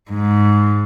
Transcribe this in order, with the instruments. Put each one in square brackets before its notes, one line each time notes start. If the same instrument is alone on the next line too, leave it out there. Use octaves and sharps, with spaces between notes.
[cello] G#2